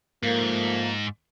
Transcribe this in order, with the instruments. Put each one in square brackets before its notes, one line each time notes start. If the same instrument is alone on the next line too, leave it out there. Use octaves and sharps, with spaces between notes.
[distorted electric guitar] G#2 [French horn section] F3 A3 A#3